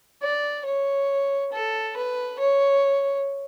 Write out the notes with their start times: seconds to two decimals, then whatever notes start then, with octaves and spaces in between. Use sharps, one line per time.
0.22 D5
0.66 C#5
1.52 A4
1.96 B4
2.39 C#5